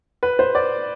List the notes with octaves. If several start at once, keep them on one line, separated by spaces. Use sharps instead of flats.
B4
C5
D5